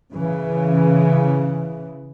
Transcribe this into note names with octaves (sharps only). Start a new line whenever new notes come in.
C#3 E3